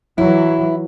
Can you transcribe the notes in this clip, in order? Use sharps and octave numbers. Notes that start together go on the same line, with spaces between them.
E3 F#3 E4